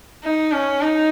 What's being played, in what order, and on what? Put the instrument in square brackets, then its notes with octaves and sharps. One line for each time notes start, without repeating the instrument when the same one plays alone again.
[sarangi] D#4
C#4
D#4